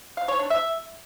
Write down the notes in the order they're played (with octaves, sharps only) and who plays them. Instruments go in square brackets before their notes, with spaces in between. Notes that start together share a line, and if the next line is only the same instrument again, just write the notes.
[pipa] F5
C#5
D4
E5